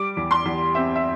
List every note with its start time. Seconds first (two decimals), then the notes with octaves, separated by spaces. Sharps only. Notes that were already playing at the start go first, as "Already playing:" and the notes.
Already playing: G3 D6
0.17 E2
0.31 C6
0.45 E2
0.75 C4 E5
0.95 E5